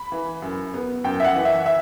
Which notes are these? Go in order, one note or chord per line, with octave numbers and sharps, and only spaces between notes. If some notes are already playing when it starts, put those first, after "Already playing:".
Already playing: B5
E3
F#2
B3
F#2 G5
E5
F#5
E3
E5
E5